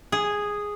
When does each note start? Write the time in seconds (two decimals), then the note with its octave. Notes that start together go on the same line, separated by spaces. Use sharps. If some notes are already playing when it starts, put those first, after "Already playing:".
0.12 G#4